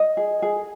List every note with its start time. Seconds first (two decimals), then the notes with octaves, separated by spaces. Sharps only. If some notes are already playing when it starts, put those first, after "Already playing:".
Already playing: D#5
0.17 G#4
0.42 G#4